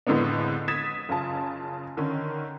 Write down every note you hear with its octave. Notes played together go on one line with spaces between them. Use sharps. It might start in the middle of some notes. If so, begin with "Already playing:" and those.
F2 A2 D3 G#3 B3 D4
D#6 G#6 A6 B6 E7
F#1 C#3 F4 A5
D3 D#3 C#4